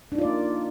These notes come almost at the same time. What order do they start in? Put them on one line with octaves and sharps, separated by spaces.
D4 D#4 F4 D5 A#3